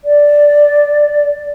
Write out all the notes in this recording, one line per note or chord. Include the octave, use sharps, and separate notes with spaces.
D5